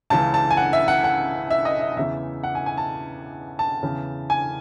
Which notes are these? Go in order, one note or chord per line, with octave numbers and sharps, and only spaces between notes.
C#2 C#3 E3 A5
A5
G#5
F#5
E5
F#5
F#5
E5
D#5
E5
E2 C#3 E3 E5
F#5
G#5
G#5
A5
A5
E2 C#3 E3
G#5